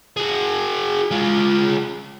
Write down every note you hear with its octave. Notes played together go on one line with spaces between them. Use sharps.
F#4 G#4
G#3 F4